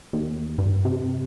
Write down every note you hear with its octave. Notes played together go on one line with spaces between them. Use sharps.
D#2
G2
C3